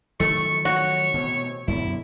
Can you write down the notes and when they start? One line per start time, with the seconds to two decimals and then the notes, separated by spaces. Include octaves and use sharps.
0.20 D#3 F3 F#3 A3 C#6
0.65 F#4 C#5
1.14 B2 E3 C4
1.68 F#2 B2 D3 E4